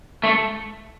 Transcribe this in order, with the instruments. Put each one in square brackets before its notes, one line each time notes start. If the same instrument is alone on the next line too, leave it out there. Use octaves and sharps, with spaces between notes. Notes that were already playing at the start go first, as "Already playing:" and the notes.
[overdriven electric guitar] A3